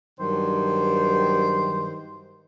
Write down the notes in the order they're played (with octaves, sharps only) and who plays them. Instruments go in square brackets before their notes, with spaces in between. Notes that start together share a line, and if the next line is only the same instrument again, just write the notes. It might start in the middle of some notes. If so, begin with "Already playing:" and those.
[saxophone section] G2 D#3 F#3 D#4 C5